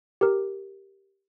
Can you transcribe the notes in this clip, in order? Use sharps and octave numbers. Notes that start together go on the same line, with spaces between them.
G4 A#4